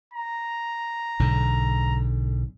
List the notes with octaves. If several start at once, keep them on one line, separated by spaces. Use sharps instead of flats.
A#5
B1 G#2 D3